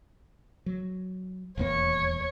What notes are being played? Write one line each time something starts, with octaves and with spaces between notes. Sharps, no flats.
F#3
D#1 E2 A#3 C#5